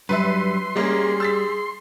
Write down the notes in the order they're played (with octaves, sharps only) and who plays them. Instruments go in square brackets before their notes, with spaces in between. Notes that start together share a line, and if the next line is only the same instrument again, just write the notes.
[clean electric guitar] G2 F#3 G3 [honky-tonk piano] B4 E5 [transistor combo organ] C6
[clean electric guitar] G3 [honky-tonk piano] G#3 A#3 C#4 [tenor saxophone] G#4
[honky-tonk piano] E6 A6 B6